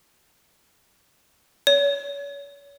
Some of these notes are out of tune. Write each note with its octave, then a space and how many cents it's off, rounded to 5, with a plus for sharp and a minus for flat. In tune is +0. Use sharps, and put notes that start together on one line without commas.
C#5 +35